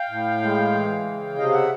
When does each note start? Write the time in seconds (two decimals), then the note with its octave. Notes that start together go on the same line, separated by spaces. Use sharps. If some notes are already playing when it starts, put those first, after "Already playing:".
Already playing: F5 G5
0.10 A2
0.42 G#3
0.74 E3
1.06 C#3
1.37 C3 D#5 F5
1.49 F5
1.54 E5 F#5